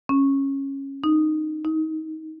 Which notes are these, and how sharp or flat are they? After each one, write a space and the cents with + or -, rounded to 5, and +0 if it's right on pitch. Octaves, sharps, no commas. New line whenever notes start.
C#4 -15
D#4 -10
D#4 +25